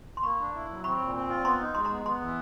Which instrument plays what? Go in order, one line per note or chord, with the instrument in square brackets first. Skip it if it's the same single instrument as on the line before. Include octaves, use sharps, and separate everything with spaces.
[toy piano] C6
[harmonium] A#3 [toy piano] B5 C#6
[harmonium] D4
E4
F#3
[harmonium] C4 [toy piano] B5 C#6
[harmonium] A#2
C4
F4
[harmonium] B3 [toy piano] A#5 C6
[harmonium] D#4
[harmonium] G#3 [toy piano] A#5 C6
[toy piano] A#5 C6
[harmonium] B3
[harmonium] B3 [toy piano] A#5 C6
[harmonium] E3